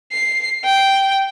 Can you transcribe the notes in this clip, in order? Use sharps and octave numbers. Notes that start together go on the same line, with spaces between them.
C7
G5